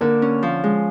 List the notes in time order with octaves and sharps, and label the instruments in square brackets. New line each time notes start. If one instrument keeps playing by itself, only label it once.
[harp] D3 [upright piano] A#3
[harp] C#4
F3
G#3